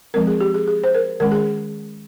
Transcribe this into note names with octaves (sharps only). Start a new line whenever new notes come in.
F3 G#3 C4 A#4
G#4
G4
G#4
G#4
C5
A#4
D#3 G#3 C#4 A#4
G#4